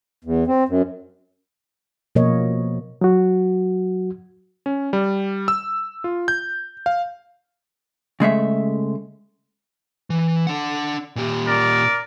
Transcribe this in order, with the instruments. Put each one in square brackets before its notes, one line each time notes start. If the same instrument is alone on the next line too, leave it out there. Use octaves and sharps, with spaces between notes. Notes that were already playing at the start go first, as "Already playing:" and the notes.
[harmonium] E2
C4
F#2
[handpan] B2 F3 A#3 A#4 C#5 D#5
[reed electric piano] F#3 F#4
[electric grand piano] C#4
G3
E6
F4
G6
F5
[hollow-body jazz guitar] C#3 G#3 A3 E5
[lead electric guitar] E3
D4 F#5
A#2 G4
[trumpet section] A#4 D5